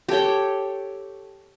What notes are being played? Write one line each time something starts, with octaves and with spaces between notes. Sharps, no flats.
G4 A4 C#5 G5